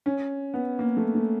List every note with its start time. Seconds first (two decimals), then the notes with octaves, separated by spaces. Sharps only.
0.06 C#4
0.54 B3
0.79 A#3
0.97 A3
1.15 A3